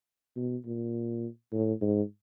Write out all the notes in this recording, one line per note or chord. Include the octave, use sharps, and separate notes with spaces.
B2
A#2
A2
G#2